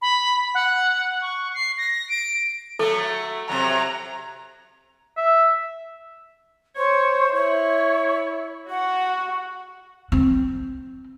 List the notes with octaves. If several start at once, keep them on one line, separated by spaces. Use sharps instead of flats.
B5
F#5
C#6
C7
A#6
D7
F#3 A3 A4
C3 F#3 A#5
E5
C5 C#5
E4 C#5
F#4 F#5
C4